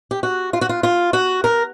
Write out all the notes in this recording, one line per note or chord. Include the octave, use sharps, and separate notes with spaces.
G4
F#4
F4
F#4
F4
F4
F#4
A#4